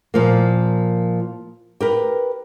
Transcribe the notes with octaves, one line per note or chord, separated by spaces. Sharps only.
A#2 F3 A#3
G4 A#4 B4